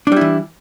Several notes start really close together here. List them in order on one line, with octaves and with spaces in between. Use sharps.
D4 G3 E4 E3